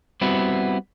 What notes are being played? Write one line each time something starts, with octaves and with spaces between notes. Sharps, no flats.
G3 B3 C4 E4 F#4